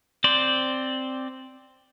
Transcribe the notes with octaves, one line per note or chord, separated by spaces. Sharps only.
C4 C5 D5